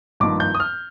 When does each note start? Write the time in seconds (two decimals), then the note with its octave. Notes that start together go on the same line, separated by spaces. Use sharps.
0.20 G#1 G2 F3 A#3 D#4 D6
0.40 G6
0.55 D#6
0.60 F6